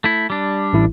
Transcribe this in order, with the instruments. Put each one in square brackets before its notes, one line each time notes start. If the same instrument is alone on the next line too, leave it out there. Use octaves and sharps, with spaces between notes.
[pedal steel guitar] A3 E4
G3 D4
[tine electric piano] A1 E4